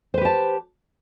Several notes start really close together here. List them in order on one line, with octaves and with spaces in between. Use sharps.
C5 B4 G4 A5